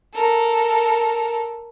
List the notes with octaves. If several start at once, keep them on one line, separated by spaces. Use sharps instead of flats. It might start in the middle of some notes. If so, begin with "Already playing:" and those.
A4 A#4